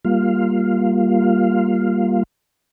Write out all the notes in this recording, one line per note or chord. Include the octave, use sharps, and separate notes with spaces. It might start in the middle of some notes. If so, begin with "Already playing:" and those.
G3 A#3 F4 F5